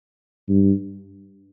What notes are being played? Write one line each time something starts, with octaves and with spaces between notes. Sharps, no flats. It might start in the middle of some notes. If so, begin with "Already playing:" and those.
G2